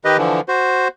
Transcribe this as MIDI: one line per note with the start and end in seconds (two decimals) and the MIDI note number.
0.05 0.17 51
0.05 0.17 67
0.05 0.17 71
0.05 0.17 75
0.18 0.40 50
0.18 0.40 52
0.18 0.40 53
0.48 0.88 66
0.48 0.88 72